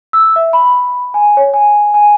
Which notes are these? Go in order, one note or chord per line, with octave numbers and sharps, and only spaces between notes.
E6
E5
B5
G#5
C#5
G#5
G#5